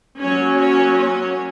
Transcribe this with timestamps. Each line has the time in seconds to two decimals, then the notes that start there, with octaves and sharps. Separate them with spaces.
0.19 F#3 A#3 C#4 C#5
0.58 C#5
0.96 C#5